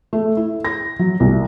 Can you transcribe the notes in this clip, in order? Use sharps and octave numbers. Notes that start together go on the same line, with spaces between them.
A3
E4
A#6
F#3
C2